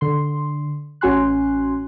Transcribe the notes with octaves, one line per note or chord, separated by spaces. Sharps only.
D3 C6
A1 C#4 F#4 G#5 C6 F#6